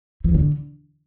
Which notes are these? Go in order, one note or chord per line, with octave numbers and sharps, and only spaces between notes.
E3
D3